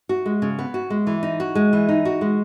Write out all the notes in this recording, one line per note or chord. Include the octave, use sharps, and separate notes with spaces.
F#4
G#3
C#3
B3
F#4
G#3
E3
D#4
F#4
G#3
E3
D#4
F#4
G#3